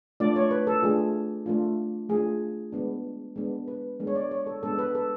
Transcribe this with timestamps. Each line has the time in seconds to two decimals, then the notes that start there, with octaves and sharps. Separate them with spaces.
0.20 A3 D4 F4 D5
0.36 C#5
0.51 B4
0.67 A4
0.82 A3 D4 F4 G#4
1.46 A3 D4 F4
2.09 A3 D4 F4 G#4
2.72 G#3 B3 D4
3.36 G#3 B3 D4
3.68 B4
4.00 G#3 B3 D4
4.07 C#5
4.15 D5
4.31 C#5
4.47 A4
4.63 G#3 B3 D4 A4
4.79 B4
4.95 A4